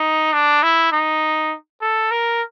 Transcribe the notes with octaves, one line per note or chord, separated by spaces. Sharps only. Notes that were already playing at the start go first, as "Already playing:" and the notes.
Already playing: D#4
D4
E4
D#4
A4
A#4